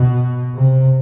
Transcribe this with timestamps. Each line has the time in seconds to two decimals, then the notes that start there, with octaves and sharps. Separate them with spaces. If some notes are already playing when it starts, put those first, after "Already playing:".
Already playing: B2
0.54 C3